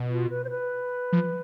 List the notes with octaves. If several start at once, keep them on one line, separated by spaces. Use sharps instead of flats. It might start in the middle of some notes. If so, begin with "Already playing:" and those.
Already playing: B2
F4
B4
C5
B4
F3